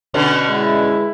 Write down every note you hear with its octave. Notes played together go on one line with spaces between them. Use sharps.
B2 D3 C#4
G#3 E4